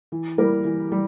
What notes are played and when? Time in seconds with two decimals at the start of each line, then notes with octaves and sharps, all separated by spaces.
0.12 E3
0.38 G3 A#3 E4 A#4
0.65 E3
0.92 G3